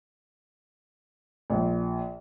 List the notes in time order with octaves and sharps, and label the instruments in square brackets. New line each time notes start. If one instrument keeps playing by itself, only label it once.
[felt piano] A#1